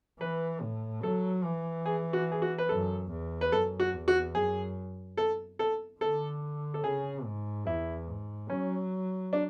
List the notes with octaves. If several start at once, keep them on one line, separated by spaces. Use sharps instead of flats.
E3 B4
A2
F#3 A4
E3
G#4
F#4
G#4
F#4
B4
F#2 A4
E2
B4
F#2 A4
F#4
E2
F#4
F#2 G#4
A4
A4
D3 A4
A4
C#3 G#4
G#2
E2 E4
G#2
F#3 C#4
D4